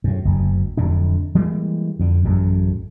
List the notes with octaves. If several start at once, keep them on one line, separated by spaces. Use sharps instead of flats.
F#2 A2
F#1 D2
D1 F2 A2 D4
E3 G3 G#3 A#3
F2 D3
A1 F#2 A2 C#3